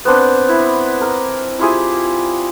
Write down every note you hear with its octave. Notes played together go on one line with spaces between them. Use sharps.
B3 C4 D4
E4
A#4
E4 F4 G4 G#4